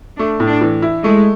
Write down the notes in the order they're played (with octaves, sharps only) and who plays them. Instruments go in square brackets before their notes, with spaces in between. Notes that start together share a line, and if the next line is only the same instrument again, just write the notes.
[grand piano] A3 [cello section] D4
[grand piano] A2
[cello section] D4
[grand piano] E3
E4
[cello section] G#3 [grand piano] A3